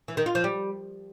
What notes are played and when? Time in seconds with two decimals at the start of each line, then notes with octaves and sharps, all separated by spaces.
0.08 E3
0.17 D#3
0.26 F4
0.35 F3
0.44 G3